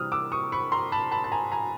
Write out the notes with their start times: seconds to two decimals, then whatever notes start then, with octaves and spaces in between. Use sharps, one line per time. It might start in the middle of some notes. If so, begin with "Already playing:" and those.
Already playing: C3 E3 G3 D#6 F6
0.12 D6 E6
0.32 C#6 D#6
0.52 B5 C#6
0.72 A#5 C6
0.92 A5 B5
1.12 A5 B5
1.24 A5
1.32 G#5 A#5
1.52 G#5 A#5